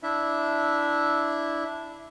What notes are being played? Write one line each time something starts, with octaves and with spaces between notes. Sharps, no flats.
D4 E4 E5